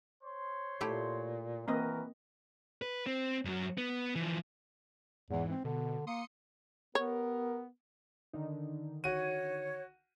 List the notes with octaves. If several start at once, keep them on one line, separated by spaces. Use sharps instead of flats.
C5 C#5 C6
A#2 A3 E4 G4
E3 A#3 C4 F#4 A#4 B4 D#5
B4
C4
F#2 F#3
B3
E3 F3
E2 G#2 E3
C4
B2 D3
A#3 C6 D#6 C#7
B3 G4 A#4 C#5
D3 D#3 D#4
F#4 C#5 D#7